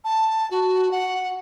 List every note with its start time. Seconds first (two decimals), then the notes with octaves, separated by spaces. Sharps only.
0.05 A5
0.51 F#4
0.91 F#5